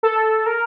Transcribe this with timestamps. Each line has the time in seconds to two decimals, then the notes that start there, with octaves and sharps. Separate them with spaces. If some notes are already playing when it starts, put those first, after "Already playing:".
0.03 A4
0.46 A#4